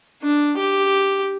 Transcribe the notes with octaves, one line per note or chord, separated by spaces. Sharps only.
D4
G4